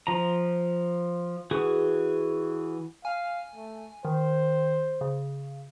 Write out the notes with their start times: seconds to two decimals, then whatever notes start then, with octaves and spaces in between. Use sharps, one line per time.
0.07 F3 A#5
1.51 E3 F#4 G#4
3.05 F5 G#5
3.55 A3
4.05 D#3 C5
5.01 C#3